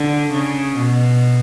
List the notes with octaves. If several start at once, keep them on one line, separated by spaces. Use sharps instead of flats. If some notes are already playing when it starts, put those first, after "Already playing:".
Already playing: D3
C#3
B2